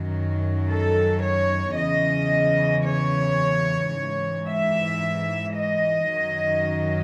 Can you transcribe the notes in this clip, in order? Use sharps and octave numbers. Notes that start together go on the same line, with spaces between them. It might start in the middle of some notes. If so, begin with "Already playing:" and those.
Already playing: F#2 D#3 F#3
A4
C#5
E2 C#3 E3 D#5
C#5
G#2 E3
E5
D#5
F#2 D#3 F#3